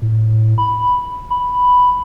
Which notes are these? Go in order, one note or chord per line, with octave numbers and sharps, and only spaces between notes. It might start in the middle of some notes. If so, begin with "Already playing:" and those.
A2
B5
B5